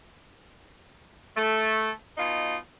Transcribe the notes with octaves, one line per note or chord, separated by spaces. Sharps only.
A3
B2 D#4 F4